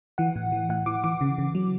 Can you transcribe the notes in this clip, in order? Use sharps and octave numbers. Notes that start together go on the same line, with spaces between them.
E3 F#5
A2
E3
A2 F#5
E3 D6
E3 D6
C#3
C#3
F#3